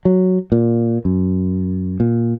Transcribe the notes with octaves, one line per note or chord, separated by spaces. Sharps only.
F#3
A#2
F#2
A#2